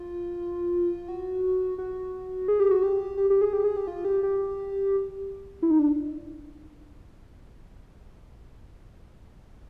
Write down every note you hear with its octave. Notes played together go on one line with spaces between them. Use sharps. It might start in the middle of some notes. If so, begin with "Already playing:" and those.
Already playing: F4
F#4
F#4
G#4
G4
F#4
G4
G4
G4
G#4
G4
G#4
G4
F4
G4
G4
E4
D#4
D4